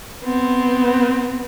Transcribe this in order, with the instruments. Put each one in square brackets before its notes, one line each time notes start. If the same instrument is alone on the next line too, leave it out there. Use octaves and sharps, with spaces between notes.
[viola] B3 C4